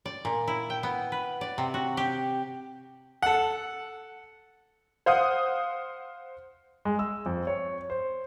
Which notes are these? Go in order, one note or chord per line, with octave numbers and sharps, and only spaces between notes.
D5
A#2
E4
G5
B3
B4
D5
C3
F#4
G4
A4 F#5
C5 F5 F#5 D#6
G#3
E6
F2
C#5
C5